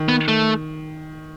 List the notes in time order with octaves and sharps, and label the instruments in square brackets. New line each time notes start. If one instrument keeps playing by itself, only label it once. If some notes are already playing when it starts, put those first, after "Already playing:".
Already playing: [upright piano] D#3
[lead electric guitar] B3
A3